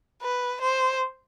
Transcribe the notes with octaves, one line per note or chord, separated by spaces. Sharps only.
B4
C5